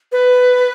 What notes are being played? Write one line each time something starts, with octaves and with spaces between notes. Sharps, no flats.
B4